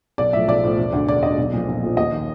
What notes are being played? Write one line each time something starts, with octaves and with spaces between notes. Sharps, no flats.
B1 D5
A2 F3 E5
B1 D5
A2 F3
E1
D2 D3
E1 D5
D2 D3 D#5
B1
A#2 F3
B1
A#2 F3
D#2 D#5
D#3